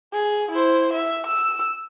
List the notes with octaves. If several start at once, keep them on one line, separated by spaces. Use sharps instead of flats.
G#4
E4 C5
E5
E6